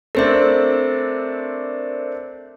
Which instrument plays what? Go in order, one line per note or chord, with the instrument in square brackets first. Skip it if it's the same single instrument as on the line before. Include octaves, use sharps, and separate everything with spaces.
[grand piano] A3 C4 D4 [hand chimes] A#4 C5 E5